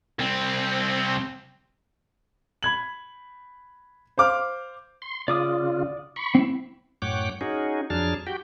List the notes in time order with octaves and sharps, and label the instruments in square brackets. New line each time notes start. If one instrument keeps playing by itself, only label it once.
[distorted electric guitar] C2 C4
[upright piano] B5 G#6 F#7
C5 F5 D6 F6
[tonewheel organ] C6
[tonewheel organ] C#3 F4 [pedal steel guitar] D5 D6 D#6
[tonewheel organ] B5 C#6
[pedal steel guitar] C4 E4
[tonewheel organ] F#2 A2 C#5 F#5 G5 D6
C#4 D#4 F#4 G#4
F2 F#3 D4 G#4 A5 F6
F#4 G4 G5